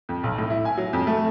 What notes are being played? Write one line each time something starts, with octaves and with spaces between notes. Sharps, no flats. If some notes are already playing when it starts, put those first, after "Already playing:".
F2
B1
A2
E4
G#5
F#3
F2
A3